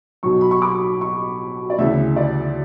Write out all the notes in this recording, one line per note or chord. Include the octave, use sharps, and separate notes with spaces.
B1 B2 F#3 C#6
B5
C#6
D6
C#6
D5
D2 C#3 E3 E5
D5